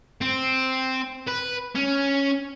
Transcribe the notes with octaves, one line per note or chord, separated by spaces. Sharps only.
C4
B4
C#4